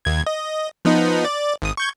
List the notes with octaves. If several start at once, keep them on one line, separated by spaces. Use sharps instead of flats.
D#2 G#6
D#5
F3 B3 D#4
D5
G#1 D#6
C#6 G6 G#6